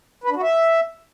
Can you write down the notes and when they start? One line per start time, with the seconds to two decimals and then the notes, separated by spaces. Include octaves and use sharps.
0.24 B4
0.30 D4
0.36 F#4
0.42 E5